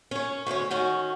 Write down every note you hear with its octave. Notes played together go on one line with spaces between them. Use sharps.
C#4 C#5
D2 G#2 C#4 C#5
D#3 C#4 F#4